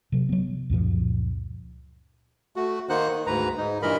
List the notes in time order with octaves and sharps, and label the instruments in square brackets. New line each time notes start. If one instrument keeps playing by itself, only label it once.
[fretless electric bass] C3 F#3
F#3 B3
C#2 F#2 A#2 F3
[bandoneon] A3 F#4
D#3 A#3 D#4 C5 F#5 F#6
D#3
D2 G#2 B4 A#5
G#2 D#4
G2 A#2 E3 A#4 D#5 B5